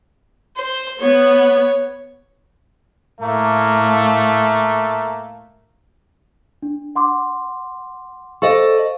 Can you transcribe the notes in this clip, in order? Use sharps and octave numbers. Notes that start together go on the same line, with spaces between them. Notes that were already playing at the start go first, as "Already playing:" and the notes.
C5
B3 C#5
A2 A3 A#3
D4
F#5 C6 D6
A4 C5 D5 D#5 F5 C#6